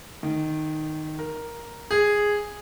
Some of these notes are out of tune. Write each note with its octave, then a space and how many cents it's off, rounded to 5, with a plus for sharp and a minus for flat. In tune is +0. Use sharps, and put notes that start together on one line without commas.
D#3 -5
A#4 +5
G#4 -5